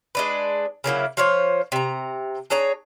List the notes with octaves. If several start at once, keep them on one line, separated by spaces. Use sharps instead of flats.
G#3 D4 B4
C#3 F#3 A#3 E4
F3 F4 C5 C#5
C3 A#5
D4 G#4 C#5 A#5